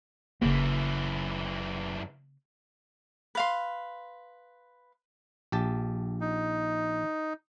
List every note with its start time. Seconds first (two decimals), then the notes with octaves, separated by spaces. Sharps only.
0.42 F#1 F#2 C#3 E3 A#3
3.35 B4 F5 C6
5.52 A#1 G4 A5
6.21 D#4